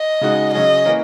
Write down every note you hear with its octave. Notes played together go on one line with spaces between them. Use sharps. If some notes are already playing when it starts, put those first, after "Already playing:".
Already playing: D#5
C#3 G#3 D#4 F#4
C#3 F#3 C#4 G#4 D#5
E3 A#3 C#4